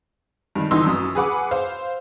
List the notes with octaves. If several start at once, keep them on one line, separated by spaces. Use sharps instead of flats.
G2 D#3
G1 E3 D#4 C6 E6
F#2 D#6
G#4 B4 F#5 D6
C5 F5